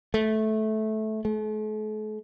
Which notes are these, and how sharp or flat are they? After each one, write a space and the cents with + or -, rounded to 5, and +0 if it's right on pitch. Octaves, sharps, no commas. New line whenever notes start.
A3 -15
A3 -45